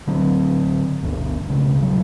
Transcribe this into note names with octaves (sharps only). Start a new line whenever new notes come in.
D3 F#3 A#3 C4
G1 D2 D4
B1 C#3
D#1 F#3